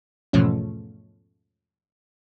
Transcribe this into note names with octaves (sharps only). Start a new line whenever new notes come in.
E2 G#2 B2 F3 A3 C#4